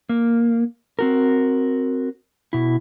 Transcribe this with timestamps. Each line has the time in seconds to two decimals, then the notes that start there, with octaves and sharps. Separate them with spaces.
0.09 A#3
0.99 C4 F#4 A#4
2.53 B2 E4